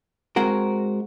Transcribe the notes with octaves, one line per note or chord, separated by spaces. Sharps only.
G#3 C4 F#4 A#4